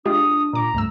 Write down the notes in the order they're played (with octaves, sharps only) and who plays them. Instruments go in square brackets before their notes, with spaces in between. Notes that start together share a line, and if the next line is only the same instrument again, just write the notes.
[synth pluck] G#3 F4 G4 [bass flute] D4 [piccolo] D#6
[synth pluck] A#2 D6 [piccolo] A#5
[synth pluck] C#2 G2 E6 [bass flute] A3